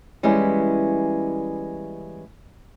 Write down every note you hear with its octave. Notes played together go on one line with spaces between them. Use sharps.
E3 G3 G#3 B3 C#4 E4